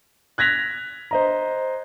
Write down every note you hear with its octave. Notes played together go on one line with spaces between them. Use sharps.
F#6 G#6 A#6 B6 F7
C5 D#5 A#5